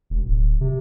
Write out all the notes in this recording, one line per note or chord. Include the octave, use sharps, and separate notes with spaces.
E1
D1
C3